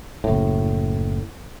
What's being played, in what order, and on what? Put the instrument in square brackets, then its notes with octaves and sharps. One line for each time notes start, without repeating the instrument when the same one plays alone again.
[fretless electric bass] F#1 A2